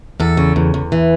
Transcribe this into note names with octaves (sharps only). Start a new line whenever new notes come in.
E2 A4
C#3
E2
E2
E3